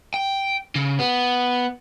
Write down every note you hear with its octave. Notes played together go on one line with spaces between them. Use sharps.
G5
C#3
B3